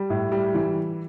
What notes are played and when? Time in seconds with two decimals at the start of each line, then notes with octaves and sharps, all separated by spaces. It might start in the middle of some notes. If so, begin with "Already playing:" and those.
Already playing: G3
0.10 A2
0.32 G3
0.55 E3